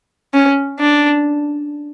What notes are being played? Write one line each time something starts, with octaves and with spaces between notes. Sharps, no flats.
C#4
D4